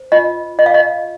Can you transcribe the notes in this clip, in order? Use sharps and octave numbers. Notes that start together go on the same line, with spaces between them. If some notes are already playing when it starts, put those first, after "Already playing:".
Already playing: C5
F4 D#5
F4 D#5
F5
D#5